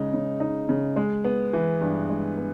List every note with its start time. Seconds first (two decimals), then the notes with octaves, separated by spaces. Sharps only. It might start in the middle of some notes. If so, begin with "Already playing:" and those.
Already playing: C#3 G#3 D#4
0.13 C#3
0.40 D#4
0.69 C#3
0.96 G#3
1.24 B3
1.53 E3
1.81 G2
2.10 G#3
2.37 B3